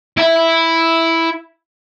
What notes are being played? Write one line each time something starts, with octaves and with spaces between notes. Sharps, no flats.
E4 E5